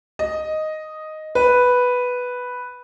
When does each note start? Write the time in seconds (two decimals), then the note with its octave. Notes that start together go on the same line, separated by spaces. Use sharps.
0.19 D#5
1.35 B4